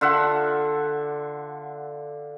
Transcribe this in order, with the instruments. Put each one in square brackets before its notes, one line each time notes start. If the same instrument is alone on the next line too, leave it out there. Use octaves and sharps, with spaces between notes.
[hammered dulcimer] D3 F4 E5 F#5